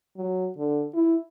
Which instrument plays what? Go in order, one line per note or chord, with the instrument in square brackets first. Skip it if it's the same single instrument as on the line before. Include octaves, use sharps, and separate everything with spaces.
[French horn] F#3
D3
E4